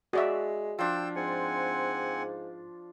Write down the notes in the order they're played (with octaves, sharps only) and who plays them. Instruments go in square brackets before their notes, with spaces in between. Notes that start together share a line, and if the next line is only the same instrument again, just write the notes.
[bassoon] G#3 [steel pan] F#4 D5 E5
[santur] F3 D4 [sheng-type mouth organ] G5 E6
[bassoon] G#2 [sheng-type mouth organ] C4 F#5 G#5